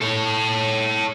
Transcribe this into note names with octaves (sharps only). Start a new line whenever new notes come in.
A4 C#5